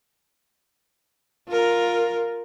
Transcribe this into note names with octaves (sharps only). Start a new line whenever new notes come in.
F4 A#4